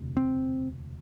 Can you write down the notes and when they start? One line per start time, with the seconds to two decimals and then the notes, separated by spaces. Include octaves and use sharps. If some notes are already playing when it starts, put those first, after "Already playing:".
Already playing: E1 D2 C3
0.17 C4